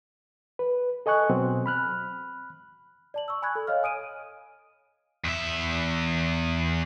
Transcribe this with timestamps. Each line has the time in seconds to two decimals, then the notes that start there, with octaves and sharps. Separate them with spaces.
0.59 B4
1.06 A4 D#5 G#5 C#6 F#6
1.30 B2 F#3 C4
1.66 B5 F6 F#6
3.14 D5 A5 F#7
3.28 C#6 E6
3.42 G#5 B5 C#6 F#6 G#6
3.55 A4
3.67 C#5 D#5 F5 F6
3.83 G#5 D#6 D7 D#7
5.24 E2 E5